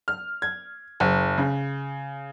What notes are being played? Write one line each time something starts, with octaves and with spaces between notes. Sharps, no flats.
F6
G#6
F#1
C#3